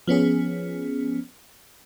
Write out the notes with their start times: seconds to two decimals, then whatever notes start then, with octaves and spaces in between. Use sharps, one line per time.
0.08 F3 B3 C#4 G#4